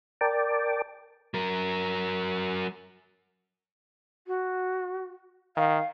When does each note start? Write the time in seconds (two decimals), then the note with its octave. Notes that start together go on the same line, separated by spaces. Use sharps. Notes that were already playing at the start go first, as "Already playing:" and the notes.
0.21 A#4 D5 G5 A5 D6
1.34 F#3 A#4
4.27 F#4
5.57 D#3 F5